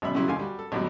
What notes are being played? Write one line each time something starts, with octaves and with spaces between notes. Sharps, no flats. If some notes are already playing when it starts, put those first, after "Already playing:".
G#1 F#2 B2 E5 B5
C#3 F#3 G3 C#4 E4 C6
D#2 D3 A3 F5 G#5 C6
G3 F#4
A4
G#1 E2 A2 D3 F#3 G3